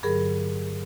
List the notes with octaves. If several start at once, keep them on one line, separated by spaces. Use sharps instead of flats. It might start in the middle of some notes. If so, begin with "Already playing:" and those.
G2 D3 F#3 G#4 A#4